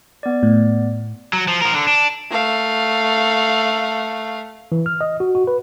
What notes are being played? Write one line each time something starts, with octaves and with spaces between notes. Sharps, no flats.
B3 D5
A2
F#3
F3
F3 A#4
D3
D4
A3 F5
E3
F6
D#5
F#4
F#4
B4